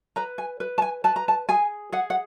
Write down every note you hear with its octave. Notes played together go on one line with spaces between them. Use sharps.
B4 A#5
G#5
B4
A5
G#5
B4 A5
A#5
A5
G#4 G#5
G#4 F#5
F#5